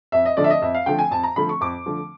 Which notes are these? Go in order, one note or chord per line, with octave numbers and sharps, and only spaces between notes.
F2 E5
D#5
D3 F3 A3 D5
E5
D#5
F2 E5
F5
D3 F3 A3 G5
G#5
F2 A5
A#5
D3 F3 A3 B5
C#6
F2 D6
D3 F3 A3